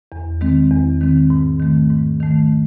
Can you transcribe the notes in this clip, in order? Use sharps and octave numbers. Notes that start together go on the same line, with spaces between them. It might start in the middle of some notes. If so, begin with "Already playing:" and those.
E2
D#3 G#3 C4
E2
D#3 G#3 C4
G#2
D#3 A3
G#2
D#3 A3